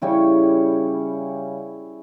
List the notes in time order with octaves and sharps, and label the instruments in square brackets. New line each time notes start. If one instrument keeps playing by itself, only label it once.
[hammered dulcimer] C#3 G3 C#4 E4